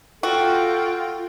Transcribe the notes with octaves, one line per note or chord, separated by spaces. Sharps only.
F4 F#4 A4 G5